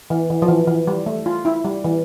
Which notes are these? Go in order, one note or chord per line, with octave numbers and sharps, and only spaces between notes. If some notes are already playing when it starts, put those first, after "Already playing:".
E3
E3
F3
E3
E3
G3
A3
F4
E4
G3
E3